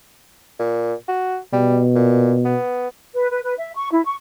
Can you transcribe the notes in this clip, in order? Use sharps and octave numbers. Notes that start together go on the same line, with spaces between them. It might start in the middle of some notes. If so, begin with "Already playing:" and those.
A#2
F#4
B2 G3
A#2
B3
B4
B4
B4
E5
C#6
E4
C#6